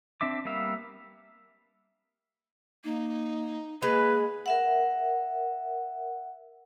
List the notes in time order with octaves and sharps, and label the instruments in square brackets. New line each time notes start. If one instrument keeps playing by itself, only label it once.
[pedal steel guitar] C4 D4 E5 D6
G3 A#3 B3 E5 F5
[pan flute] A#3 [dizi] D#4
[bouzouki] G#3 [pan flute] A#3 [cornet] B4
[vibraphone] A#4 E5 F#5